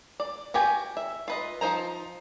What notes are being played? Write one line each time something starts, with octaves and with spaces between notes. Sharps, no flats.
D5
F#4 G4 G5 G#5
E5
F4 B4 D#5
F3 D#4 C5 A#5